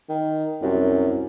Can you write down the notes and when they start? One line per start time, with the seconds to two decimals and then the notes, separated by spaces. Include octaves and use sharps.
0.09 D#3
0.62 C2 F#2